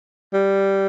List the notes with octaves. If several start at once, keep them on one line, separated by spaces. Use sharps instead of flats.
G3